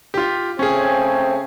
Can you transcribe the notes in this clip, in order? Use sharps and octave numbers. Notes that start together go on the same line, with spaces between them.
F4 G4
C#3 A3 C4 C#4 G#4